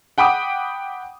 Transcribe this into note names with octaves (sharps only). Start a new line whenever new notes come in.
F#5 G5 B5 D6 D#6